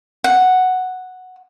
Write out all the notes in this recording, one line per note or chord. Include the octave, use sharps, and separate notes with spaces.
F#5